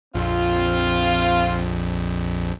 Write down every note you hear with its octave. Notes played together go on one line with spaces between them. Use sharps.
A#1 F2 C4 F4